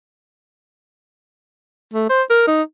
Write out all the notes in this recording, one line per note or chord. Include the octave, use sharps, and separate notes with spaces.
A3
C5
A#4
D#4